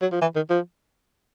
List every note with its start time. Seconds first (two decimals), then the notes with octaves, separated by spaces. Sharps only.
0.02 F#3
0.12 F3
0.21 E3
0.36 D#3
0.50 F3